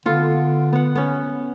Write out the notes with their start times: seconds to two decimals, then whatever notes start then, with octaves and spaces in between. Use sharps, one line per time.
0.06 D3 B3 F4 A4
0.73 B3 F#5
0.95 B3 C#4